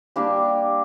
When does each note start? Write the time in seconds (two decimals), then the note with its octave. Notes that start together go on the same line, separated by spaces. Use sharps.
0.16 G3 A#3 D4 G4